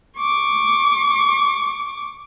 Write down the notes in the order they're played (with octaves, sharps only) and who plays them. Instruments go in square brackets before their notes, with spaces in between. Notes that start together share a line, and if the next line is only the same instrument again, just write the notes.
[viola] C#6 D6